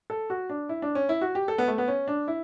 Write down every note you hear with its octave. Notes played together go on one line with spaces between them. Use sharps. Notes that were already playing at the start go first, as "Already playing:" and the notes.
A4
F#4
D4
E4
D4
C#4
E4
F#4
G4
A4
B3
A3
B3
C#4
D4
E4